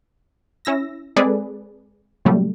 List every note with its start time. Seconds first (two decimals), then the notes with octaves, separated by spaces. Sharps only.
0.65 C#4 E4 E6 A#6
1.16 G#3 C4 G#4 A4 B4 D5
2.25 A#2 C#3 F#3 G3 A3